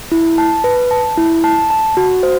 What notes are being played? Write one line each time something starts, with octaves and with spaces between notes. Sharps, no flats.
E4
A5
B4
A5
E4
A5
A5
F#4
C5